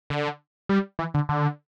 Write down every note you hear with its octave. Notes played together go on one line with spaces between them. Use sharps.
D3
G3
E3
D3
D3